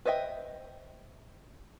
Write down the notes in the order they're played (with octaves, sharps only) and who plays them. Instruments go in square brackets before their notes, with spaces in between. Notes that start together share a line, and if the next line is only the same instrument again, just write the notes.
[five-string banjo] B4 C5 D#5 E5 G5